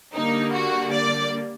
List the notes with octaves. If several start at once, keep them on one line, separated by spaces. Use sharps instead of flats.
D3 G3 A#3 D#4
F#4
D5